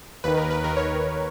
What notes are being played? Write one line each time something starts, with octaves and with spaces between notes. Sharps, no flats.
D#2 D#3 B4
A#4
B4
D#2 D#3 A#4
C#5